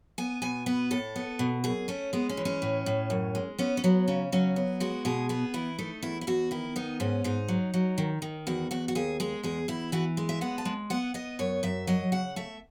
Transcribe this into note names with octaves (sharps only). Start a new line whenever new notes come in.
B3 G#5
B2 G#5
B3 B4
A2 A4
B3
B2
F#2 G#4
A3 C#4
G#3 B3
C#4
E3
C#4
A2
A2
F#2
G#3
B3 C#4
C#4
F#3 B3
C#3 C#4
F#3 C#4
B3
G#3 F#4
B2 G#4
B3 G#4
E3 E4
A3 D#4
E2 E4
E4
E2 F#4
D#3 E4
B3 D#4
G#2 C#4
G#2 D#4
F#3
F#3
D#3
D#3
E2 F#4
E2 F#4
F#4
D#2 G#4
G#3 G#4
E2 G#4
E2 E4
E3 F#4
G#3
E5
B3 F#5
A5
G#3
B3 F#5
B3 D#5
F#2 C#5
F#2 E5
F#3 D#5
C#3 F#5
A3 E5